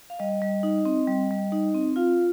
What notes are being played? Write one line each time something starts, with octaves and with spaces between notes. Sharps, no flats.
F5
G3 D#5
G3
D#4
C4
G3
G3
D#4
C4
F4 F5